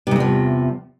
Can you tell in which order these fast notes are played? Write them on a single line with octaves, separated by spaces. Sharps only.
C3 G#2 E2 F3